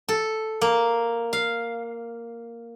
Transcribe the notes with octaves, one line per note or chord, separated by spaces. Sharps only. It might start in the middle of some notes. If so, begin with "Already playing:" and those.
A4
A#3
F5